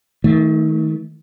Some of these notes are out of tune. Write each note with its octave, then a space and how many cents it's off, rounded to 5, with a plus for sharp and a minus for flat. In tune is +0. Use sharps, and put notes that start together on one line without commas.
D#3 +35 A3 -5